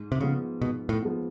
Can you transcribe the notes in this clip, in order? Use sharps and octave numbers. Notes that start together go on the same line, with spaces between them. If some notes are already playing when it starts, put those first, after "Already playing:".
Already playing: G#2
C3
C#3 F3 G#3 B3
G#2 B2
A2
F3 G#3 B3